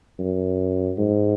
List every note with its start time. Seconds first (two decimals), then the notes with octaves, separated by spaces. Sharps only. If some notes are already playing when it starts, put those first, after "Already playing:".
0.19 F#2
0.98 G#2